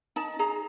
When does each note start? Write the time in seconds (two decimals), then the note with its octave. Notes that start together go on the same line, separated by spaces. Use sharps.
0.16 D#4 A5
0.39 G#4 A#5